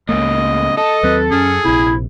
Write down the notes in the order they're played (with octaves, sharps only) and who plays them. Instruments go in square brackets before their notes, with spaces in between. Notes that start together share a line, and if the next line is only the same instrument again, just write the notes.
[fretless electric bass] C#2 G#3 A#3 [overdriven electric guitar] A2 C#3 [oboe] D#5
[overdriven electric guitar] A4 [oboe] D#5
[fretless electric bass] D#2 F#3 C4 [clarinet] B4
[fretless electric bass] F#2 [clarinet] C#4 [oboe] G#4
[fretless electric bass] A#1 C3 [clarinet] E4